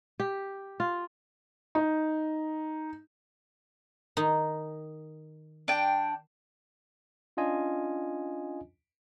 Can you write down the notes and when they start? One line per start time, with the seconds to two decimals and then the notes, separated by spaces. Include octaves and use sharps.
0.20 G4
0.80 F4
1.75 D#4
4.17 D#3 D#4
5.68 D4 G5
7.37 C#4 D4 F4 D#5 G#5